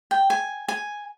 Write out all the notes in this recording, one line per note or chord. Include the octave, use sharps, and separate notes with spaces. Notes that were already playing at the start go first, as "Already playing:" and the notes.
G5
G#5
G#5